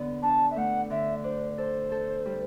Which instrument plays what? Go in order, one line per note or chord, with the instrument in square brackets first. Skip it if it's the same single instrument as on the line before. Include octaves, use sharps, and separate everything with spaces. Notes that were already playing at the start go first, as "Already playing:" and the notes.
Already playing: [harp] D3 B3
[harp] D4 [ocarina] A5
[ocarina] E5
[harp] A3 [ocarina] F#5
[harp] D3 [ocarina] E5
[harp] D4 [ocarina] C5
[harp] A4 [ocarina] C5
[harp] A4
G3